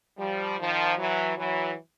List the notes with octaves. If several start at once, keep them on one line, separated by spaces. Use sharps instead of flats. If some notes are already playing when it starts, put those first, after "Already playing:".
F3 G3
D#3 F3
E3 F#3
E3 F#3